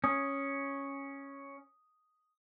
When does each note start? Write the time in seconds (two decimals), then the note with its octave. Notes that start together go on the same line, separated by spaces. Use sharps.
0.04 C#4 D#6